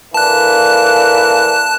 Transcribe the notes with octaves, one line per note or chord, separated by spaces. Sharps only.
D3 E3 A#3 A5 F#6